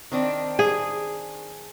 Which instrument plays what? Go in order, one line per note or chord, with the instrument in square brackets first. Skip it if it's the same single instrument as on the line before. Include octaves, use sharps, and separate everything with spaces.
[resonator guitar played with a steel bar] D#3 C4 D4
[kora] G#4